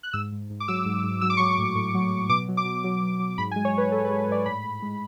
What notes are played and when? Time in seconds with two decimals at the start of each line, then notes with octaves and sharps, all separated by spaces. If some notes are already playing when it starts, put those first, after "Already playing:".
0.03 F#6
0.13 G#2 E6
0.32 G#2
0.50 G#2
0.60 D6
0.68 F#3 E6
0.86 G#2
1.04 G#2
1.21 F#3 E6
1.30 D6
1.37 F#3 C#6
1.46 D6
1.58 A2
1.75 A2
1.95 F#3
2.12 F#3
2.29 B2 D6
2.49 F#3
2.57 D6
2.65 B2
2.84 F#3
3.02 F#3
3.20 F#3
3.38 G#2 B5
3.51 G#5
3.56 G#3
3.65 C#5
3.73 G#2 B4
3.91 G#3 A4
4.05 B4
4.10 G#3
4.18 B4
4.28 G#2 D5
4.46 A2 B5
4.64 A2
4.82 G#3